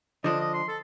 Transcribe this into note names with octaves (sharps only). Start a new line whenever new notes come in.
D3 F3 D4 D#5
D#5
C6
A4